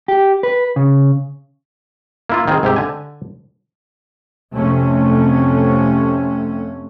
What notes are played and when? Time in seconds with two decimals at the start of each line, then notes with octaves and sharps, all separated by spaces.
0.08 G4
0.43 B4
0.76 C#3
2.29 A#3 E4 F4
2.48 D#3 C4 G#4
2.63 G#2 C3 G4
2.76 D3 G#5
4.54 F2 C3 A3 C#4